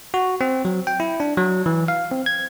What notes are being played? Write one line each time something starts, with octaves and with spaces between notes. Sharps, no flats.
F#4
C4
F#3
G5
E4
D4
F#3
E3
F5
C4
G#6